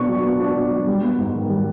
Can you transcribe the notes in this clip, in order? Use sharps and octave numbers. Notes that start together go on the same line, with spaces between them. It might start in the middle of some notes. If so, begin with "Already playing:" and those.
Already playing: B2 B3 D4 C#6
F#3
B3
D4
B2
F#3
G3
B3
G#2
D#3
G3